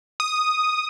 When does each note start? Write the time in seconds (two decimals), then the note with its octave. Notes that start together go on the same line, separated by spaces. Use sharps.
0.20 D#6